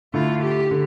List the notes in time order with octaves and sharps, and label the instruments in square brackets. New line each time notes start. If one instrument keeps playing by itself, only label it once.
[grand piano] D3 A3 E4 [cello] F4
[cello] G4
[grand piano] D3